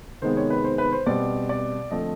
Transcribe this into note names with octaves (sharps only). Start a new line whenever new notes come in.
C3 D#3 G#3 B3 C5
C#5
B4
C5
B4
C5
B2 G3 C4 D5
D5
D3 F3 A3 C4 D#5